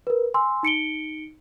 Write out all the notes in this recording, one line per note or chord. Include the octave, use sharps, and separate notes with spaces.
A#4 B4
G#5 C6 E6
D#4 C#7 D7 G7